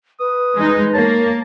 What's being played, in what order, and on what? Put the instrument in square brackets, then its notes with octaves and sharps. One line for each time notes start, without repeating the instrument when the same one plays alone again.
[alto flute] B4 [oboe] D#6
[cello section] G#3 D#4
[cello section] A#3 [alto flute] C#5 [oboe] A5